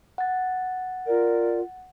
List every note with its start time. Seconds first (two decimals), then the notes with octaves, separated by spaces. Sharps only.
0.18 F#5 A6
1.07 F4 A#4 D5